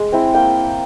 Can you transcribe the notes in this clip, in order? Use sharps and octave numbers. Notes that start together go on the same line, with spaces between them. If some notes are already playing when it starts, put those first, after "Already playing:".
Already playing: G#3
C4 E4
A#3 G5